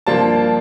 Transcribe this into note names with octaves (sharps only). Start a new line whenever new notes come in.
G2 F3 A#3 D4 F4 A5